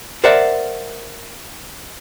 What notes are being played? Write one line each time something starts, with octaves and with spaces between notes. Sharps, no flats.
A#4 C5 D5 E5 F#5